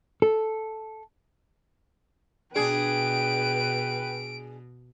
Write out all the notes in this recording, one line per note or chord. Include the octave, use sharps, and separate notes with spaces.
A4
B2 D4 G#4 B4 G5 D7